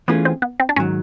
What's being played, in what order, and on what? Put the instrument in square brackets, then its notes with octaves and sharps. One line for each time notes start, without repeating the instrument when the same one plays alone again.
[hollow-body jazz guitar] E3 A3 C#4 F4 G#4 [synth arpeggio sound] B3
[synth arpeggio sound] C4
B3
C4
D4
[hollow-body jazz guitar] G#2 D#3 F#3 [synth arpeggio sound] C#4